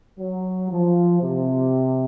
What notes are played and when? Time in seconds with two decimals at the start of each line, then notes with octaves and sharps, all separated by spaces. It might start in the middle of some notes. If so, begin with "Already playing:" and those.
0.19 F#3
0.71 F3
1.22 C3